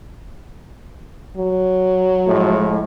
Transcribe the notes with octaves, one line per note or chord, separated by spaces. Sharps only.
F#3
A2 F3 G#3